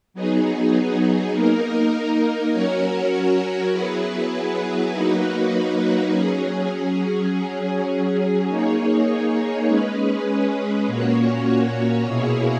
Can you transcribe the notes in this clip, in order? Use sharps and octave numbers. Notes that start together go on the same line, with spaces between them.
F#3 B3 D#4 G#4
A#3 D#4 A#4
F#3 C#4 F#4 A#4 C#5
F#3 B3 E4 G#4 B4
F#3 A#3 D#4 F#4 B4
F#3 C#4 G#4
F#3 C#4 G#4
A#3 D#4 G#4 C#5
G#3 C#4 G#4 B4
A#2 A#3 C#4 F#4 C#5
B2 A#3 E4 G#4 C#5